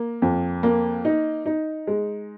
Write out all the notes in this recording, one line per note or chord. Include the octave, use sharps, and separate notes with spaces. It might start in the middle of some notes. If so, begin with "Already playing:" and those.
Already playing: A#3
F2
A#3
D#4
D#4
G#3